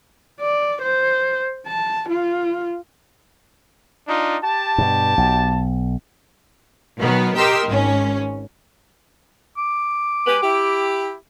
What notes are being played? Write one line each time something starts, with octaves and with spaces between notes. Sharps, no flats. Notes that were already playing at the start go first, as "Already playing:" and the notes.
D5
C5
A5
F4
D4 D#4 F4
G4 A5
G2 B2
B1
B2 D#3 F#3 B3
G4 A#4 D#5 G5 C6 E6
G#1 C#4
D6
G#3 G4 B4
E4 G4